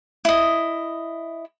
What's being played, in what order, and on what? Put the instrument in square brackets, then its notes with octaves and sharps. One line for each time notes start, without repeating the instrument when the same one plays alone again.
[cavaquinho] E4 D#5